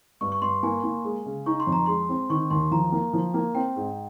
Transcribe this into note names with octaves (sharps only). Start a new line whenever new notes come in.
G2 C#6
C#6
G2 C6
A#3 G#5
A#3
G#3
C#3
D#4 C#6
C6
F2
A#5
G#3 C6
C4
D#3 C#6
D#2 C6
F3 A#5
A#3
F3
A#3
C4 G5
G#2